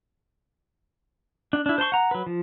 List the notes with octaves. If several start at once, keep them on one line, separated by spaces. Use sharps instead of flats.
D4
D4 E4
C5 A5 C6 C#6
F#5 A#5
F#3 B4
F3